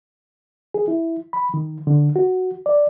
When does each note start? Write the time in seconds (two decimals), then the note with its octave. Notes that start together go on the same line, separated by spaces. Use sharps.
0.74 G#4
0.88 E4
1.33 B5
1.54 D#3
1.87 D3
2.16 F#4
2.66 D5